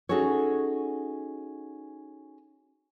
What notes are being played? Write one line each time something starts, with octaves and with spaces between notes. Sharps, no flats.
C#4 D#4 F#4 G#4 A4 C#5